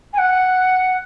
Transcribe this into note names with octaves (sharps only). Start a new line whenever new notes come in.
G#5
F#5